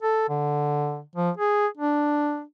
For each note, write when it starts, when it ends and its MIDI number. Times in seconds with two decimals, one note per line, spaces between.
0.03 0.28 69
0.29 1.01 50
1.15 1.30 53
1.37 1.67 68
1.77 2.43 62